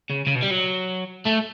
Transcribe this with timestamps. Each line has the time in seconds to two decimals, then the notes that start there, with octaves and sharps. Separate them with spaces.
0.10 C#3
0.27 C#3
0.35 B2
0.42 G3
0.51 F#3
1.25 A3